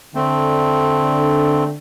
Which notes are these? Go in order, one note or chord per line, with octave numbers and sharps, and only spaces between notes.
D3 A3 C4